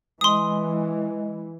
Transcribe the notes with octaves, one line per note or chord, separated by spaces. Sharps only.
E3 G#3 D#5 C6 D#6